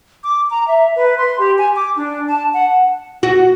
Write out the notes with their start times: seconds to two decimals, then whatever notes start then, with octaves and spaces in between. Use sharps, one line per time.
0.23 D6
0.50 A#5
0.67 E5
0.95 B4
1.17 C6
1.39 G4
1.58 G#5
1.75 D6
1.96 D4
2.29 A5
2.53 F#5
3.23 F#4